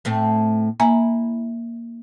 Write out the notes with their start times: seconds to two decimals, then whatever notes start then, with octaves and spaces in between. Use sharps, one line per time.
0.05 A2 A3 C4
0.80 A#3 E4 G#5 A#5